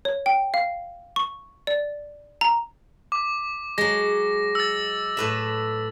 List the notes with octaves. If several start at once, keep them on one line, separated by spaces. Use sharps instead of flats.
C#5
G5
F5
C#6
D5
A#5
D6
F#3 G#3 A#6
E6 A6
A2 B4 E5